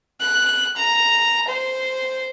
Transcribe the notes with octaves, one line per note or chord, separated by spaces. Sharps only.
F#6
A#5
C5